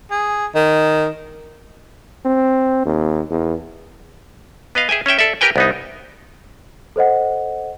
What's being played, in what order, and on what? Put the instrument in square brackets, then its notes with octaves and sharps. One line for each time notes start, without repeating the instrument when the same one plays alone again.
[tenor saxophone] G#4
D#3
[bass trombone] C4
D#2
E2
[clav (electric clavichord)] B3 B4 D#5 F5
G#4 E5 G5 G#5
C#4 C#5 E5 G5
A4 D5 E5
G4 A#4 B4 G5 G#5
C2 B3 D#4
[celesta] A4 C5 D#5 F#5